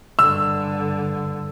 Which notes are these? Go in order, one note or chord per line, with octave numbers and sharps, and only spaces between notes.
G2 D3 E6